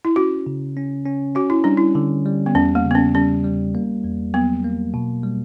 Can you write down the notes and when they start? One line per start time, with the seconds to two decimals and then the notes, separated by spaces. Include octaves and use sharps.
0.05 E4
0.16 C#4 F#4
0.46 C#3
0.77 C#4
1.05 C#4
1.35 C#4 F#4
1.50 E4
1.64 G3 D4
1.77 E4
1.95 D3
2.26 G3
2.46 B3
2.55 E2 C#4
2.75 A#3
2.85 C#3
2.91 B3
2.95 C#4
3.15 G3 C#4
3.44 G3
3.75 A#3
4.04 E2
4.34 F#3 B3
4.64 A#3
4.94 B2
5.24 G3